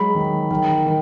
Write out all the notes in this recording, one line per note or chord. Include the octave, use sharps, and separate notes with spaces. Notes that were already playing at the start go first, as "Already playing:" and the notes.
Already playing: F#3 G#3 B5
D#3
D#3
D#3